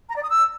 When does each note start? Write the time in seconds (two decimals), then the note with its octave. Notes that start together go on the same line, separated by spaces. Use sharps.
0.09 A#5
0.16 D5
0.23 D#6
0.30 E6